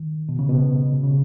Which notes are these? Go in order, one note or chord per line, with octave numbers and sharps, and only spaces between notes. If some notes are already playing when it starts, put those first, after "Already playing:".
Already playing: D#3
B2
C#3
B2
C#3